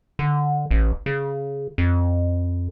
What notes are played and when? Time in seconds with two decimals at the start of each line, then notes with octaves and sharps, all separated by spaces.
0.19 D3
0.71 A1
1.06 C#3
1.78 F2